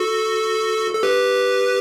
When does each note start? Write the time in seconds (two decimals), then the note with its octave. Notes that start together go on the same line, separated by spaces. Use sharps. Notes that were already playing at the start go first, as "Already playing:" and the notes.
Already playing: F#4 A4
0.94 A4
1.03 G4 B4